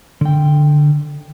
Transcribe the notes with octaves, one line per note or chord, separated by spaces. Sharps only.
D3 G5